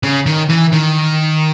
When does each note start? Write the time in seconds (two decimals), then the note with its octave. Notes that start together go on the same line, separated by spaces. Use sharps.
0.03 C#3
0.26 D#3
0.49 E3
0.72 D#3